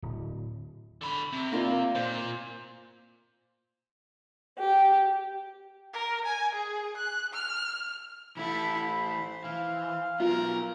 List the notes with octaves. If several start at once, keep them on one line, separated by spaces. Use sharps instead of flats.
D1
D3 B5
C3
A#3 F4 D5
A#2 C5
G4
A#4
G#5
G#4
F#6
F6
E3 A3 E4 A4 B5
C5
E3 F5
F#3 B3 F4 A#4